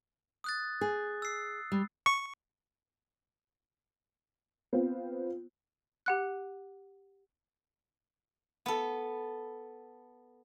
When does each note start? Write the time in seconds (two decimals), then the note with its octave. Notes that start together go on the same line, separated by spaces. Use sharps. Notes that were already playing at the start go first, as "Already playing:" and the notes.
0.44 D#6 F#6 A6
0.81 G#4
1.22 E6 C7
1.72 G3
2.06 C#6
4.73 B3 C4 F4
6.06 G4 F#5 F#6
8.66 B3 A4